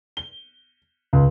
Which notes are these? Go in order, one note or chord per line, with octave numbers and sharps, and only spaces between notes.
G7
C#2